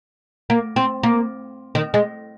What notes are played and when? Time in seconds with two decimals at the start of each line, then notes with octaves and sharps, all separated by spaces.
0.50 A#3
0.76 C4
1.03 A#3
1.75 D#3
1.94 G#3